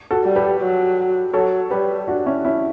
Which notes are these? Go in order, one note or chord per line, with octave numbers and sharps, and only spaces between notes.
F#4 A4
G3
G4 B4
F#3
F#3 A4 C#5
G3 G4 B4
D4 F#4
C#4 E4
C#4 E4